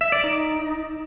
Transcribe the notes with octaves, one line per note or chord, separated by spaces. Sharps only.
E5
D5
D#4